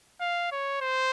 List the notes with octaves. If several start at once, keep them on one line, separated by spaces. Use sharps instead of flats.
F5
C#5
C5